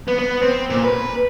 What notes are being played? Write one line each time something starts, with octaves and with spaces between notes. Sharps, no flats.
B3
B3
C4
A#2
B4